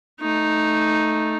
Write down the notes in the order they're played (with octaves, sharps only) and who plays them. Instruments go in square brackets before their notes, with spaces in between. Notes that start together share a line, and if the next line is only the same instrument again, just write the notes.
[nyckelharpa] A3 D#4